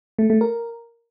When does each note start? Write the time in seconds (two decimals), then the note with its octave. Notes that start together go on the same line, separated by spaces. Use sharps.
0.19 A3
0.30 A3
0.41 A#4